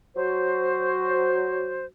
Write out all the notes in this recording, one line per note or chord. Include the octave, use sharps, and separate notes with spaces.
F#3 F#4 C5